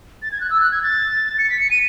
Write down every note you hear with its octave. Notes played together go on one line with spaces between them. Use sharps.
A6
G#6
F#6
E6
F#6
G#6
A6
C#7
B6
C#7
D#7